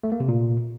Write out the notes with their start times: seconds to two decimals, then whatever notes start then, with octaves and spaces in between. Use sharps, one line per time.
0.04 A3
0.12 A#3
0.20 C3
0.28 A#2